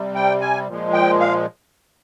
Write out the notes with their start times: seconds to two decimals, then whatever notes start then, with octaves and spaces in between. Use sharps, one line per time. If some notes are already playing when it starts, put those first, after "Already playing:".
Already playing: C3 G3
0.15 G5
0.41 G#5
0.68 A#2 F3 G#3
0.93 G5
1.20 F5